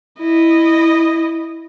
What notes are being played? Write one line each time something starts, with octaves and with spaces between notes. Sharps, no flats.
E4 D#5